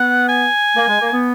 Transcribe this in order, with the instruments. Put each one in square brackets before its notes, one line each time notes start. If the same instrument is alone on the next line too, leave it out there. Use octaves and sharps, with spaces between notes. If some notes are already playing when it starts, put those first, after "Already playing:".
Already playing: [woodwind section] B3 [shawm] F#5
[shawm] G#5
[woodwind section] A#3
G#3
A#3
B3